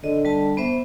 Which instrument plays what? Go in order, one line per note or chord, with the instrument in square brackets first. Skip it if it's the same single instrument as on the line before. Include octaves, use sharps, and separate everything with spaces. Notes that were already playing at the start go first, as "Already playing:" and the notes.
[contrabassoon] D3 [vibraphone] D#5
[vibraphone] G3 A5
B3 C5 E5